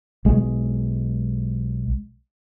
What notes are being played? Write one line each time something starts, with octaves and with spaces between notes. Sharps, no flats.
B1 G#3